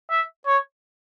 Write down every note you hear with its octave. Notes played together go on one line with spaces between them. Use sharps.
E5
C#5